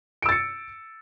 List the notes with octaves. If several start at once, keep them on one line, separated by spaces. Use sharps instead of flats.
E6 A6 C#7 D7